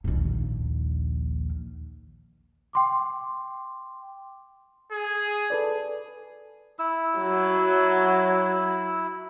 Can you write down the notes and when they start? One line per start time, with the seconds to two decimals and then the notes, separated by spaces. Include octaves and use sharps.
0.04 A#1 D#2
2.73 G5 C6 D6
4.92 G#4
5.50 A4 B4 D5
6.79 E4 E6
7.19 F#3